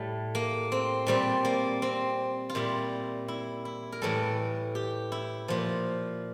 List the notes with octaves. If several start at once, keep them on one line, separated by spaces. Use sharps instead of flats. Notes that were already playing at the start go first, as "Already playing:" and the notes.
Already playing: A2 G3 A3
A#3
C4
A#2 G3 C4
A#3
C4
F4
A#2 G3 E4
E4
E4
A#4
A2 E3 G3 A4
G4
E4
A#2 F3